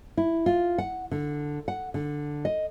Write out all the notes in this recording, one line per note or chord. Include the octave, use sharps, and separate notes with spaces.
E4
F4
F#5
D3
F#5
D3
D#5